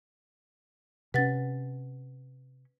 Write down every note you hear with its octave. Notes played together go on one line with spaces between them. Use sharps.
C3 C#4 B4 F#5 A6